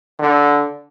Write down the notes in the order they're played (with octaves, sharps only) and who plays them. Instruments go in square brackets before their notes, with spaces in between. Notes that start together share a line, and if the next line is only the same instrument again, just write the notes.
[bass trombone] D3